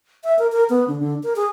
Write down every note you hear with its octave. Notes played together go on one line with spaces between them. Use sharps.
E5
A#4
A#4
B3
D3
D3
A#4
G#4